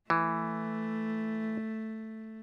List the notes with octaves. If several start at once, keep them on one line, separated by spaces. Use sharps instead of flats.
E3 A3